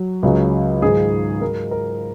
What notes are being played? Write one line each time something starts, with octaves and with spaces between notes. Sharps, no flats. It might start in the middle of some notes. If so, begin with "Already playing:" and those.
Already playing: F#3
C#2 C#3 F#3
G#2 D#3 F#3 G#4
G#2 F#3 A#4
A#4